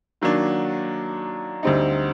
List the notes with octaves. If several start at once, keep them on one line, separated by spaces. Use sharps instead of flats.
D#3 F#3 A#3 D4
D2 D3 G3 C4 D#4